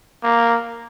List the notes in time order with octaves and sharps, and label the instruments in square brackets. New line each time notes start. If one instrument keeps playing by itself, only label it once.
[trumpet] A#3